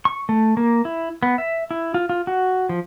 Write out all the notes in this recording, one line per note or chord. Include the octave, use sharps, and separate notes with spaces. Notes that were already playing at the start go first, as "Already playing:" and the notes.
C#6
A3
A#3
E4
B3
E5
E4
F4
F4
F#4
F3